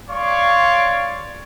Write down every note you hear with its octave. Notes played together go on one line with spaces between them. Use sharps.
C#5 D5 F5 C6 C#6